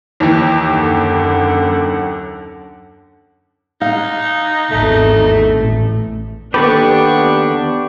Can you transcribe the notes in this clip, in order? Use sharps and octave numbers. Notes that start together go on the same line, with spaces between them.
D#2 E3
F#2 D3 F#5
D#4 F5
G#1 E2 A3
A1
D#2 B3 D4 G4 A4 B4 D5 C#6